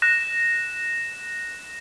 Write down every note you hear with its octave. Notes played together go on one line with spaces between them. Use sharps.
F#6 A#6 E7